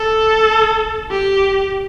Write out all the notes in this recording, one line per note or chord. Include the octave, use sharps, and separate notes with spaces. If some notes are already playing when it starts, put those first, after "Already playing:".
Already playing: A4
G4